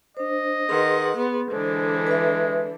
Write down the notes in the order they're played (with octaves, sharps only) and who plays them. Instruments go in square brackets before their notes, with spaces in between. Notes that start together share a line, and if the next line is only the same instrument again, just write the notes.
[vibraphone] D4 C5 [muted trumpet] D#5
[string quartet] D#3 F#5 [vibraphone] G#4 B4 C6
[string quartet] B3
[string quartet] D3 E3 D4 [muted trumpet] G#3 [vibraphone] C5
[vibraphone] B4 E5